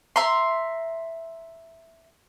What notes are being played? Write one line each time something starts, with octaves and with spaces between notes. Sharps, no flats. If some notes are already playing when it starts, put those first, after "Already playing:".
E5 A#5 C6